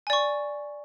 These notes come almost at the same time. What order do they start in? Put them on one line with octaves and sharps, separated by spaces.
G#5 D5 C#6